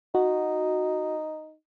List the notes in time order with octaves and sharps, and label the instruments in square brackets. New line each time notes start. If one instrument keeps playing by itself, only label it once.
[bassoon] D#4 [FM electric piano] F#4